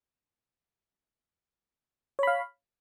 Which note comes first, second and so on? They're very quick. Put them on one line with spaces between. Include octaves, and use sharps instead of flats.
C#5 B5 F5